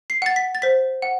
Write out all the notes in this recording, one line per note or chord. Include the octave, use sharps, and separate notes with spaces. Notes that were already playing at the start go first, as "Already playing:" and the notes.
C7
F#5 A6
B6
A6
C5 B6
F#5